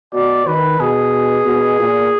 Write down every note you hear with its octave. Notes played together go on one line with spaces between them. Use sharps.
B2 D5
D#3 B4
B2 G#4
B2
A#2